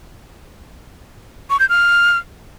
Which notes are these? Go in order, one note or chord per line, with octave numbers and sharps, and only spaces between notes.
C#6
G6
F6